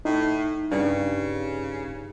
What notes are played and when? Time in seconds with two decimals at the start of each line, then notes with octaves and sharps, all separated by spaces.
0.05 A2 D#4
0.71 G2 C#3